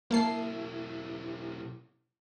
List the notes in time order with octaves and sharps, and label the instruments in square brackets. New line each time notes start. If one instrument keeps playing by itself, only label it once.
[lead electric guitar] B1 E4 [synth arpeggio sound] A#3 A5 C7